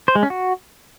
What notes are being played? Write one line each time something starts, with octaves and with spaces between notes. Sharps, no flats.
C5
G#3
C#4
F#4